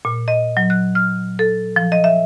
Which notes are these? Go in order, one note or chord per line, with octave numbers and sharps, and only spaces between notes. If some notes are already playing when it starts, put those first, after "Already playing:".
A#2
D#5
F#3
F#6
F6
A4
F3
D#5
E5